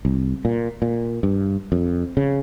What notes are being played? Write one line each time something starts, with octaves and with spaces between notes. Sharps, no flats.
C2
A#2
A#2
G2
F2
C#3